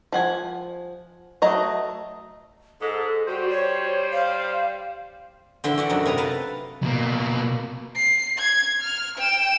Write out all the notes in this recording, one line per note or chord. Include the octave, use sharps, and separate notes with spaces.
F3 F#5 G#5
F#3 A3 D#5 A#5
G#2 A4
G3 F#4 C5
C#5
F5
D3 E3 D4 C5 E5 G5
F#4 D5 E5
F#2 C3 D4 D#4
C3 A#4 B4 A#5
A4 B4 F5 A5
B2 A#3
C7
G#6
F6
G5 E7